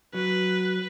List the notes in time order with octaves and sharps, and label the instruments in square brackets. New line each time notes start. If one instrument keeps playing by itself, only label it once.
[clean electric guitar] F#3 [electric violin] B4